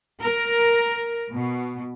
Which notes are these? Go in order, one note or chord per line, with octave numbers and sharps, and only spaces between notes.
A#4
B2